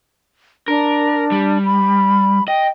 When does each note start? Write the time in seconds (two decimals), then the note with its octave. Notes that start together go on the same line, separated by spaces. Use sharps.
0.68 D4 A#4
1.32 G3
1.65 B5
2.48 D#5 G5